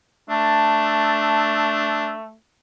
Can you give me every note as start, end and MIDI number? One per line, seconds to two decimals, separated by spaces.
0.30 2.35 57
0.30 2.14 62
0.30 1.77 81